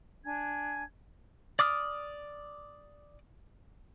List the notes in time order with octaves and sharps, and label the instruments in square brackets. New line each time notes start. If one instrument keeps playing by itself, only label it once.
[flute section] D4 G#5 G#6
[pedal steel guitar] D5 D6 D#6 F6